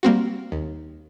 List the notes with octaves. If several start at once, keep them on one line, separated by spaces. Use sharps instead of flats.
G3 A#3 C4 F#4
D#2